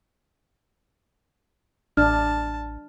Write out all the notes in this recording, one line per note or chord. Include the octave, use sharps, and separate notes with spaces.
A1 D4 A5 F6